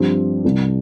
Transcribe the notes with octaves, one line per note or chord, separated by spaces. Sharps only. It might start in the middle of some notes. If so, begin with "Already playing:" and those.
Already playing: G2 F3 C4 G4
C2 C3 G3